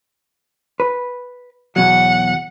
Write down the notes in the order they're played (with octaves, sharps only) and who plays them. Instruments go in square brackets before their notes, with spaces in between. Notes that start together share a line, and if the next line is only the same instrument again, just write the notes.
[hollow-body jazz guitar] B4
[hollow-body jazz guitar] E2 B2 F#3 [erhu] F#5